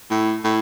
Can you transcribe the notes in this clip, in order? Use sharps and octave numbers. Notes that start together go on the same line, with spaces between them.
A2
A2